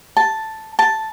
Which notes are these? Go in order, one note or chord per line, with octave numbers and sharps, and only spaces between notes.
A5
A5